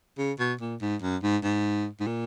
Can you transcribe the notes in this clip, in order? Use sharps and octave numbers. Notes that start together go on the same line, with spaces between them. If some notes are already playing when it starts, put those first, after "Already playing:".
C#3
B2
A#2
G#2
F#2
G#2
G#2
G#2
A#2